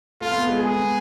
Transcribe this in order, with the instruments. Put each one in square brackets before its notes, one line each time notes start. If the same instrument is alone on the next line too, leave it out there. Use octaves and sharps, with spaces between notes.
[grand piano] A3 [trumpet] F4
[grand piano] B3
A3
G#3
[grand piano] A3 [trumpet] G#4
[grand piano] B3